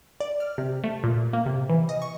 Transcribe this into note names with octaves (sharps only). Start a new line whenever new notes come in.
D5
F6
C3
A3
A#2
A#3
C3
E3
D#5
C#6